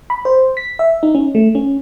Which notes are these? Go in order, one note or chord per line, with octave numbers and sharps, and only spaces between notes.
B5
C5
B6
E5
D#4
C#4
A3
C#4